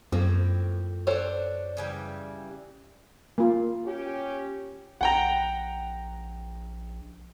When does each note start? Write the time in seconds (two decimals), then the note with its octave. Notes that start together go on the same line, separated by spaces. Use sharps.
0.12 F#2 A2 F3 A#3 C4
1.07 D4 F#4 A4 C5 C#5
1.77 C#3 E3 G3
3.38 A#3 F4
3.85 C#4 G4
5.01 A#1 F#5 G5 A#5